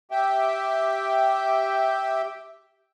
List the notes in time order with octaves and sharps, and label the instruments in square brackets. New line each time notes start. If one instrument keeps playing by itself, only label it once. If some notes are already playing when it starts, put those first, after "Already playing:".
[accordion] G4 E5 G5